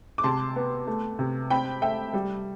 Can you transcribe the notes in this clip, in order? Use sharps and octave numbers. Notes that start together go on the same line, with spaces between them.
D6
C3 A5 C6
B3
A3
C3
C4 G5 B5
A3 E5 G5
G3